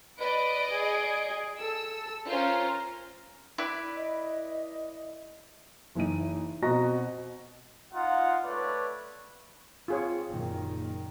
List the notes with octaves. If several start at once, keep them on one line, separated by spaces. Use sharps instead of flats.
B4 D5 D#5 D7
G#4
A4 E6
C#4 F4 A#4 C5
E4 B4 D5
D#5
F#1 E3 D#4 D#7
B2 C4 F#4 D#5 A#5 A#6
D#4 F4 F5 F#5
A3 B4 C#5 D5
C4 F4 G#4 C#5
F#1 A#2 D#3